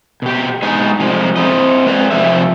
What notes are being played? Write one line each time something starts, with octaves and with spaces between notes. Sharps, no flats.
B2 G4
G#3 B3 D#4 G#5
C3 F3 G3 G#3
C4 E4 D#5
G#3 B4 D5 D#5
C3 F3 G#4 E5